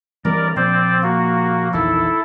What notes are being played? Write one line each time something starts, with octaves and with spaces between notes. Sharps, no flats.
E3 G3 C4 A#4 D5
A#2 F3 C4 C5 D5
A#3 F#4
A#1 E2 D#3 E4 A4